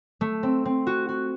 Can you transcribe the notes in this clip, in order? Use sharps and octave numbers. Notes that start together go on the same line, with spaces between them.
A3
C4
C4
F#4
F#4